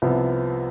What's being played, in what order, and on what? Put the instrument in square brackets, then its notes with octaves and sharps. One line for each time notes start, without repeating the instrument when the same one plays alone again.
[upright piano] C2 C3 F3 B3